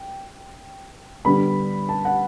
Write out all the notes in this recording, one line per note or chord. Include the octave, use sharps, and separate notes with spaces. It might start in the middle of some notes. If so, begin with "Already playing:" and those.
Already playing: G5
D3 G3 B3 D4 B5
A5
F#5